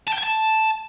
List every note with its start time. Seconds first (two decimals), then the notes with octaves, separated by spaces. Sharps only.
0.08 A5
0.13 G5
0.18 G#5
0.23 A5